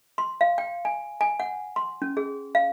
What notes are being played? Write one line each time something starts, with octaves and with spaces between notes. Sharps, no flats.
C6
F5
G5
G#5
G#5
F#5
C6
C#4
G#4
F5